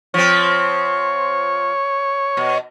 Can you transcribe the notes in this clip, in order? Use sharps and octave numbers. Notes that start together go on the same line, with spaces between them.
F3 C4 C#5
B2